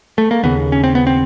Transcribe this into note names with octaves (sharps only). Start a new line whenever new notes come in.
A3
A#3
D#2 C#3 B3
C#4
C4
B3
C4